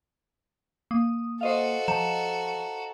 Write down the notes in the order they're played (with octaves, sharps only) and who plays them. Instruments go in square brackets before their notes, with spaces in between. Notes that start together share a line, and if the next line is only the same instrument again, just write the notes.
[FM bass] A#3 [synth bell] D#6
[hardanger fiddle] F#4 A4 [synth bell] C5 D#5 F5
[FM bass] F3 [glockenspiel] A5 A#5 E7